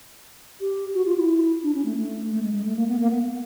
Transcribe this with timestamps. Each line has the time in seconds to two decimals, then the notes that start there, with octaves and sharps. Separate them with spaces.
0.61 G4
0.95 F#4
1.06 F4
1.18 E4
1.63 D4
1.75 C#4
1.85 A3
1.97 A3
2.32 A3
2.43 G#3
2.53 G#3
2.66 A3
2.76 A#3
2.88 B3
3.00 A#3
3.10 B3